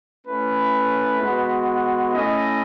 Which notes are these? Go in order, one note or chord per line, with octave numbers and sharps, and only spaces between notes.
A3 C#4 E4 B4
G#3 B3 F#4
A3 C#4 E4 D#5